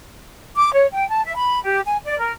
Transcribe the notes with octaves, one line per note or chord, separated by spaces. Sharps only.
D6
C#5
G5
A5
E5
B5
G4
G#5
D5
A#4